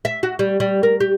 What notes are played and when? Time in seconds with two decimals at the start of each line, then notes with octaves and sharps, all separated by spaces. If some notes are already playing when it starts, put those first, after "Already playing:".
0.05 E5
0.23 F#4
0.39 G3
0.60 G3
0.83 A#4
1.00 G4